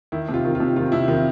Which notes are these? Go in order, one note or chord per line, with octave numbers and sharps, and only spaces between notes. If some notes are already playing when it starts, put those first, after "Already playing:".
D#3 E4
C3
F4
D#3
F4
C3
D#3 F4
C3 E4
D#3 F4